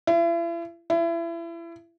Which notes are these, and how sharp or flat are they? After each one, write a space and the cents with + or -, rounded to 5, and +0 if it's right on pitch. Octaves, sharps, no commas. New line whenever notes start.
E4 +40
E4 +30